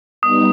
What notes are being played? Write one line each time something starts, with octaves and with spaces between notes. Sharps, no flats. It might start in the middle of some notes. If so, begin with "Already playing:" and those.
G3 B3 D#4 D#6